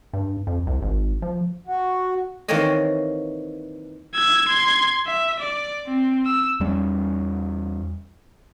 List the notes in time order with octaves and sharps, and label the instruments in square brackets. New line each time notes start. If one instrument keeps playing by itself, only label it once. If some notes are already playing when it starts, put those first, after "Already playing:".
[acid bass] G2
F2
C2
G#1
F3
[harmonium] F#4
[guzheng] D#3 E3 A#3 C4 C#5 D#5
[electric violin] E6 G#6
C6 G#6
E5
D5
C4
E6
[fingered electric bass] E2 G3 C#4